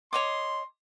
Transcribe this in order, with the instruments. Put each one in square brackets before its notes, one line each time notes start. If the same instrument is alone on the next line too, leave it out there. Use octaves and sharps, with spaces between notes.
[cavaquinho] C#5 D#5 D6 [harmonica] C6